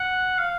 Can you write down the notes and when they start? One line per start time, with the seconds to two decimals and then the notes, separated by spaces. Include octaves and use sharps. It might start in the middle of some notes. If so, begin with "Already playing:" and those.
Already playing: F#5
0.38 F5